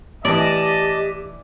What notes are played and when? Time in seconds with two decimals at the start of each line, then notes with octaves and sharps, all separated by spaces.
0.25 A2 E3 G4 D5 D#5 A5